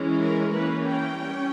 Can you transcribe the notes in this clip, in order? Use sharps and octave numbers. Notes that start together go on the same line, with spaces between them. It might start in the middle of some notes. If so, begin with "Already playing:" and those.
Already playing: E3 G#3 C#4
A#4
E3 A#3 C#4 B4
G5
G3 C#4